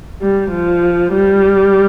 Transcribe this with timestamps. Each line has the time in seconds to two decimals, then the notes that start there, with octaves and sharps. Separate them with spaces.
0.19 G3
0.49 F3
1.12 G3